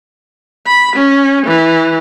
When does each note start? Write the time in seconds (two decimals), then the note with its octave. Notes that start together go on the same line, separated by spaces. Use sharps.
0.66 B5
0.96 C#4
1.46 E3